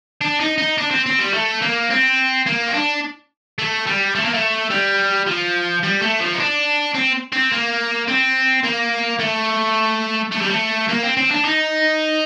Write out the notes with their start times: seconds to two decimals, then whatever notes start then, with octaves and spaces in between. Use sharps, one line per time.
0.21 D4
0.40 D#4
0.58 D#4
0.78 D4
0.91 C4
1.06 C4
1.19 G3
1.33 A3
1.62 A#3
1.90 C4
2.46 A#3
2.68 C4
2.73 D4
3.58 A3
3.87 G3
4.15 A3
4.24 A#3
4.34 A3
4.70 G3
5.27 F3
5.83 G3
6.02 A3
6.20 F3
6.34 D#4
6.40 D4
6.95 C4
7.33 C4
7.52 A#3
8.08 C4
8.64 A#3
9.19 A3
10.32 A3
10.41 G3
10.51 A3
10.89 A#3
11.03 C4
11.17 C4
11.31 D4
11.44 D#4